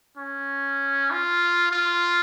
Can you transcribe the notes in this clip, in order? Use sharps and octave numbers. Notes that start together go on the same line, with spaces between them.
C#4
F4
F4